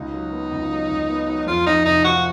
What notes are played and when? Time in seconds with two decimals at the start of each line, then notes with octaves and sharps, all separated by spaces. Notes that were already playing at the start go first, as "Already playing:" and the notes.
Already playing: C#2 D#4
0.13 F#3
0.32 B3
0.51 C#2
0.71 F#3
0.89 C#2
1.09 B3
1.27 F#3
1.47 F2 F4
1.66 F2 D#4
1.85 F1 D#4
2.04 F3 F#4